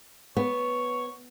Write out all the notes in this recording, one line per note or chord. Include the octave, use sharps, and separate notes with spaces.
B3 C#5